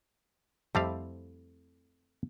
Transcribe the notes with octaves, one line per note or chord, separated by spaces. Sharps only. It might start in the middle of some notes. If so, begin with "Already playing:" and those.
F2 G3 A3 C4 E4 F5